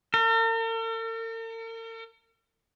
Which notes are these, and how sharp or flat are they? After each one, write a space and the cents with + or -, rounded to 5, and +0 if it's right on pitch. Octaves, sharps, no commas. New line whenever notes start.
A#4 -45